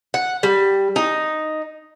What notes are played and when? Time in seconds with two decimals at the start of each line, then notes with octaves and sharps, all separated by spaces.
0.14 F#5
0.43 G3
0.96 D#4